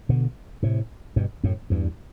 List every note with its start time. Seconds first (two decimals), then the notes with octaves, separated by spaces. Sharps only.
0.09 B2 D3
0.63 A2 C3
1.16 G2 B2
1.44 F#2 A2
1.70 E2 G2